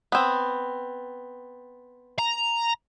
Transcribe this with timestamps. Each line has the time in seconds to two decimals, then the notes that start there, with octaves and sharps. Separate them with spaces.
0.12 B3 C4
2.19 A#5